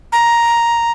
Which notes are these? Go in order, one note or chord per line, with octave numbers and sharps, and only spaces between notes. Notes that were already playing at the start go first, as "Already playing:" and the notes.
A#5